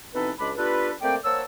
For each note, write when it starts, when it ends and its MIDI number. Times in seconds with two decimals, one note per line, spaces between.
0.15 0.31 47
0.15 0.31 52
0.15 0.31 60
0.15 0.31 63
0.15 0.31 69
0.15 0.31 71
0.40 0.51 37
0.40 0.51 56
0.40 0.51 62
0.40 0.51 83
0.57 0.92 59
0.57 0.92 62
0.57 0.92 65
0.57 0.92 67
0.57 0.92 69
0.57 0.92 71
1.02 1.17 57
1.02 1.17 58
1.02 1.17 60
1.02 1.17 72
1.02 1.17 74
1.02 1.17 79
1.25 1.43 58
1.25 1.43 72
1.25 1.43 73
1.25 1.43 78
1.25 1.43 81
1.25 1.43 88